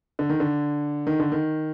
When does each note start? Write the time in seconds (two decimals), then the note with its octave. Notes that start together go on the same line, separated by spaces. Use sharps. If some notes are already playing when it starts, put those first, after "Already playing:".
0.19 D3
0.30 D#3
0.40 D3
1.07 D#3
1.19 D3
1.32 D#3